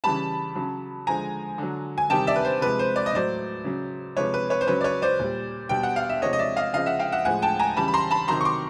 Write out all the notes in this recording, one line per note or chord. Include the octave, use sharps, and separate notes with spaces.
C#3 E3 G3 A5 B5
C#3 F#3
D3 F3 G#3 G#5 A#5
D3 F#3
G#5
C3 D#3 G3 G5 A5
D5 E5
B4
C5
C3 F3 G#3 B4
C5
D5
D#5
A2 F#3 C5 D5
C#3 F#3
C3 F3 G#3 B4 C#5
B4
B4 C#5
C5
C#3 F#3 B4 C#5
D5
B4 C#5
C5 D5
A#2 G3
B2 G3 G5
F#5
F5
E5
C3 F3 G#3 C#5 D#5
D#5
D5 E5
D#5 F5
C#3 F3 G#3 D#5 F5
E5 F#5
F5 G5
E5 F#5
A2 F3 G#3 F#5 G#5
G5 A5
G#5 A#5
C#3 E3 G3 A5 B5
B5
A#5 C6
A5 B5
C3 D#3 F#3 A#5 C6
C#6
C6 D6